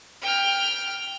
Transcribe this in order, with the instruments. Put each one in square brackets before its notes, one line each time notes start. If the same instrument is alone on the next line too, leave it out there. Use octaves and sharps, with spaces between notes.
[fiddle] G5 F6